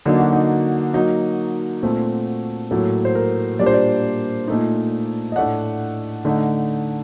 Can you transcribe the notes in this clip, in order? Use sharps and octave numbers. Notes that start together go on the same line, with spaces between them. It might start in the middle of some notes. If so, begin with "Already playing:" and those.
D3 F#3 A#3 D4 D#4
F#4
D#4
F#3 A#3 D#4 F#4
A#2 A3 C4
A2 F#3 A#3 A4
C5
A#4
A#2 G3 A#3 D4 D5
C5
D5
A#2 A3 D#4
D#5
A2 A3 D4 F#5
D3 A3 D#4